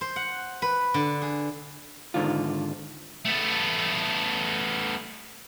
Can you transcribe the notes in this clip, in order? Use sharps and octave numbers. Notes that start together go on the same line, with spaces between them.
C5
F#5
B4
D3
G#4
G#2 D3 D#3 F4
A3 B3